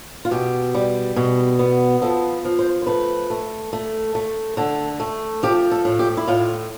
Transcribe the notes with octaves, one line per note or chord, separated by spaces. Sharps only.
F4
B2 G4
G3
B2
B3
F3 A4
F3
C5
C5
A3 B4
A3
A3
A3
D3 A4
A3
F3 G4
A4
A2
G4
E4
A2 F4